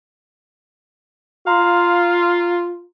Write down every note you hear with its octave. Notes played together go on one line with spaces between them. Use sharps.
F4 F5 A#5 C6